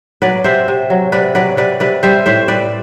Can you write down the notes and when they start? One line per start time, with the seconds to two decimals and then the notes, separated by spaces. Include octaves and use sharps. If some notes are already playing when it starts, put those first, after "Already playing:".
0.22 F#3 B4 D5
0.44 C3 C5 E5
0.68 C3
0.90 F#3
1.12 C3 B4 D5
1.35 F#3 B4 D5
1.57 C3 B4 D5
1.80 C3 B4 D5
2.03 G3 C5 E5
2.26 A2 C5 E5
2.48 G3 B4 D5